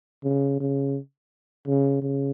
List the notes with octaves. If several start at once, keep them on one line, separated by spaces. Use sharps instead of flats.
C#3
C#3
C#3
C#3